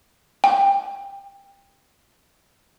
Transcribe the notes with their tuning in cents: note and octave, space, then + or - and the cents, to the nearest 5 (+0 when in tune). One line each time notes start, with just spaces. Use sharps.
G5 +20